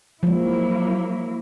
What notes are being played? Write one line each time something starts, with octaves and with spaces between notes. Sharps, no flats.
F3 F#3 G#3 A#3 E4